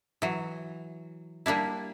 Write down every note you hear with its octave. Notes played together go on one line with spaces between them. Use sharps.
E3 F#3
G3 A#3 D4 E4